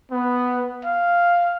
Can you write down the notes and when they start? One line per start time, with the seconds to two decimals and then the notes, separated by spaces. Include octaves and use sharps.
0.11 B3
0.85 F5